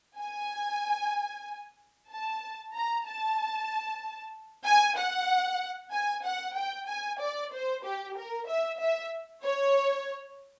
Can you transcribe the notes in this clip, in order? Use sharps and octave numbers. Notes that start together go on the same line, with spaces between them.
G#5
A5
A#5
A5
G#5
F#5
G#5
F#5
G5
G#5
D5
C5
G4
A#4
E5
E5
C#5